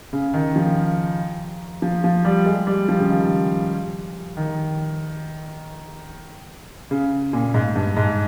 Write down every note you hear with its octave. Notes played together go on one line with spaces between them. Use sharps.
C#3
D#3
F3
F3
F3
G3
G#3
G3
F3
C#3
D#3
D#3
C#3
A#2
G#2
G2
G#2